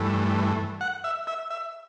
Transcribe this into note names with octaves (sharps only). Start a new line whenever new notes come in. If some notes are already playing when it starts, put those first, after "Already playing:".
Already playing: G2 E3 A3
F#5
E5
E5
E5